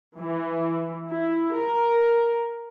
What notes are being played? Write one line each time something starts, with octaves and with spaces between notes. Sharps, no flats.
E3
E4
A#4